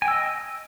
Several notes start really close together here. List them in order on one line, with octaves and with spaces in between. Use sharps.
G#5 G5 E6 D#5